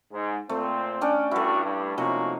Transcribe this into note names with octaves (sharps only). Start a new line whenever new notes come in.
G#2
A#2 A3 C4
C#4 D4 G5
G2 A3 E4 F#4
G2
C3 F3 A#3 C#4 D#4 F#4